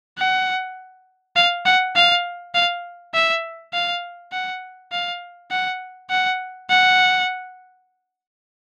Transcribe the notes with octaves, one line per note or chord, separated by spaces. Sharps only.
F#5
F5
F#5
F5
F5
E5
F5
F#5
F5
F#5
F#5
F#5